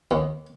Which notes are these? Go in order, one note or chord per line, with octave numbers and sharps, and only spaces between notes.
D#2